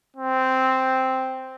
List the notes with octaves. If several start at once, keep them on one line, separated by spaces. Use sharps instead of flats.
C4